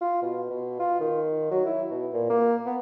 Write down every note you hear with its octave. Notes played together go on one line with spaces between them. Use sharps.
F4
B2
B2
F4
D#3
F#3
E4
B2
A#2
A#3
B3